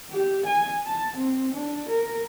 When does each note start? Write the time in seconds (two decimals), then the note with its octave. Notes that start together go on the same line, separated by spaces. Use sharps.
0.11 G4
0.46 G#5
0.87 A5
1.17 C4
1.55 D4
1.89 A#4